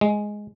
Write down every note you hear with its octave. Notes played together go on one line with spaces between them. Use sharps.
G#3